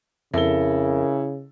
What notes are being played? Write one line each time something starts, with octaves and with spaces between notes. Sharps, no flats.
F2 C#3 E4 A4 A#4 G7